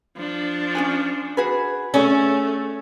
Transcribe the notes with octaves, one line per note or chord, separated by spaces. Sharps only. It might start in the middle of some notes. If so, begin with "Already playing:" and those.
F3 D4
C#4 F#4 G#5
F#4 G#4 B4
A3 C#4 G#4 D5